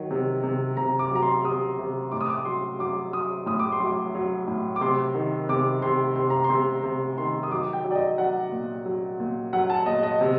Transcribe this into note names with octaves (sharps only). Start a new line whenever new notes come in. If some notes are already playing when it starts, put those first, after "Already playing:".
Already playing: D#3 F#3
C3
C3
C3 A#5
D6
F#3 A#5
C6
C3 D#6
C3
A2 D6
D#6
D6
F#3 C6
F#3 D6
F#3 D#6
A2 D#6
D6
C6
F#3
D6
F#3
A2
D6
C3 C6
D#3
C3 D6
C3 C6
C3 C6
A#5
C6
C3
C3
D#3 C6
D#6
F#3 D6
G5
F#3
D5
D#5
F#3 F#5
A#2
F#3
A#2
F#3 F#5
A5
A#2 D#5
D#5
C3